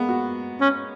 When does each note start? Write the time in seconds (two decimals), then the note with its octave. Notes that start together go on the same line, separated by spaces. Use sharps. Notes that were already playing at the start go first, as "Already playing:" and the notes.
Already playing: G#3 A#3 B3
0.08 F#4
0.61 C#4